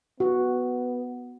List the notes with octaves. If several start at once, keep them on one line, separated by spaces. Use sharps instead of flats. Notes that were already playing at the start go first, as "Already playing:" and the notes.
B3 F#4